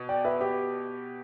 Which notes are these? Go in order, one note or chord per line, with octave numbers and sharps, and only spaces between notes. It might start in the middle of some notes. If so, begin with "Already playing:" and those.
Already playing: B2
D5 G5
B4 E5
G4 B4